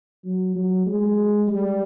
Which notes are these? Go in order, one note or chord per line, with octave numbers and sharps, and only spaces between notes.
F#3
F#3
G#3
G3